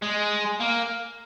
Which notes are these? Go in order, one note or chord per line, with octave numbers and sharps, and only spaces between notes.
G#3
A#3